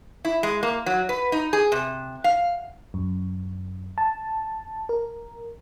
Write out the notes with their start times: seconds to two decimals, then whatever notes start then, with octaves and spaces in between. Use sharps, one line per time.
0.25 E4
0.43 G#3
0.63 A#3
0.86 F#3
1.09 B4
1.32 D#4
1.53 G#4
1.72 C3
2.24 F5
2.94 F#2
3.98 A5
4.89 A#4